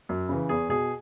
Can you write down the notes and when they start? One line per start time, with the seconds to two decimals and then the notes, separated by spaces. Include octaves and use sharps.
0.09 F#2
0.29 C#3 E3
0.49 E2 G#4
0.69 B2 G#4